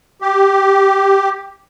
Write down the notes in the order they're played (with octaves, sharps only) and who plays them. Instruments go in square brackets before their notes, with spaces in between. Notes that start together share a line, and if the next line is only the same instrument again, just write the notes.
[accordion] G4